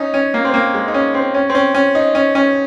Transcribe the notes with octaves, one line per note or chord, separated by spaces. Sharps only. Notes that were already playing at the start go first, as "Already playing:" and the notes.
Already playing: C#4 D#4
C#4
A#3
C4
A#3
G#3
D#4
C#4
C4
C#4
C4
C#4
C#4
D#4
C#4
C#4